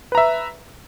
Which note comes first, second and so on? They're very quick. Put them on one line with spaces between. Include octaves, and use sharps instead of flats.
B4 A#5 E5